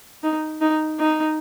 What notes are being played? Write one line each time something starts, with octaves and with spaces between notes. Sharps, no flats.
D#4
D#4
D#4